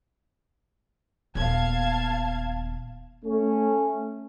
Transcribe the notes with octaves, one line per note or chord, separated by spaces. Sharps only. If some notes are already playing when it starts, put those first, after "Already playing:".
D#1 B3 F5 A5 G#6
A3 C#4